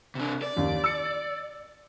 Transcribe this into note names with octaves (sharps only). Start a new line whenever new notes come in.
C3 D4
D5
D#2 D#3 A#3
E6 C#7